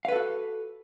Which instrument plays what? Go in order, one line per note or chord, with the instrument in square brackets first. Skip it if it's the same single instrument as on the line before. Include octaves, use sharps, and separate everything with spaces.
[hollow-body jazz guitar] F5
B4
A4
F#4